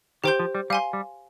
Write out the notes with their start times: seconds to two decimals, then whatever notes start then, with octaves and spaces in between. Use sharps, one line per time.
0.24 D#3 G4 C5 G5 C6 G6
0.40 F3
0.55 G3
0.70 G3 F5 G#5 C6
0.93 G3